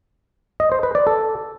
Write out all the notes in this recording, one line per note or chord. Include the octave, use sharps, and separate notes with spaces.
D#5
C5
B4
D5
A4